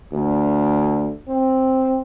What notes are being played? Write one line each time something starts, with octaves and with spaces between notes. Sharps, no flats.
D2
C4